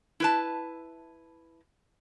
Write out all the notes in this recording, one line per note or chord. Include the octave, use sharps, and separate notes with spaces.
E4 B4 A5